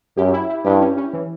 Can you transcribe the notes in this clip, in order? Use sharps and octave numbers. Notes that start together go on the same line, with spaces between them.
F#2 G4
E4
E4
G2 G4
C#4
C#4
E3